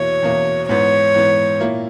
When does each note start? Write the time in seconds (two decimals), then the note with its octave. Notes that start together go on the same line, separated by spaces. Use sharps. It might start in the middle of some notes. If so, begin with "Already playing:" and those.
Already playing: E2 B2 A#3 E4 C#5
0.22 E2 B2 A#3 E4
0.69 G#2 E3 B3 C#5
1.14 G#2 E3 B3
1.60 A#2 A#3 E4